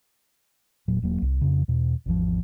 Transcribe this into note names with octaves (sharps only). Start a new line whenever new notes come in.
E1 A#2 F#3
E1 F#3 A#3
C2
F2 C#3
E2 B2
G#1 E2 B2 F3